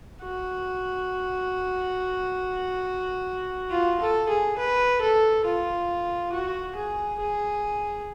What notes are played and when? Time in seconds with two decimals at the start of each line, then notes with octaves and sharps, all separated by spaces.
0.22 F#4
3.71 F4
4.00 A4
4.29 G#4
4.58 B4
5.01 A4
5.45 F4
6.32 F#4
6.75 G#4
7.19 G#4